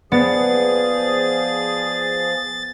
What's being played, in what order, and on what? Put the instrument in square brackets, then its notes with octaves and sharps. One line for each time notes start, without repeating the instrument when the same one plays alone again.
[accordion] F3 G#4 [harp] B3 [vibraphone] D5 [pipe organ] A6